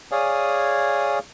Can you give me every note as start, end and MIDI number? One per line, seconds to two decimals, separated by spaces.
0.12 1.19 68
0.12 1.19 73
0.12 1.19 74
0.12 1.19 77
0.12 1.19 80
0.12 1.19 87